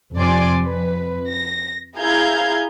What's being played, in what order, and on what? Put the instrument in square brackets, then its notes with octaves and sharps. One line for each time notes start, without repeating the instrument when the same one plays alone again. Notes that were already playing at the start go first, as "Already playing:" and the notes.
[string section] F2 C3 D5 G#5 C6 D6
F2 B4
A#6
E4 G#4 F5 A#5 G6 G#6